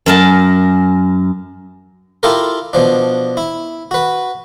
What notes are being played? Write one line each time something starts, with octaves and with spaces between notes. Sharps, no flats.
F#2 A#4 A5
E4 F4 G4 A4 A#4
B2 F3 D4
E4
F#4 B4